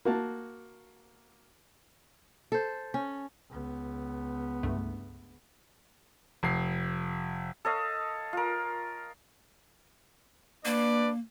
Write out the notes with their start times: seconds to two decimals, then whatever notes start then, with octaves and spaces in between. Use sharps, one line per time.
0.05 A#3 F#4 A5
2.52 A4 C5
2.94 C#4
3.50 C#2 B3
4.63 C2 G2 A3
6.43 F1 C7
7.65 A4 C#5 D#5 F5
8.33 F4 A#4
10.65 A#3 D4 B4 D5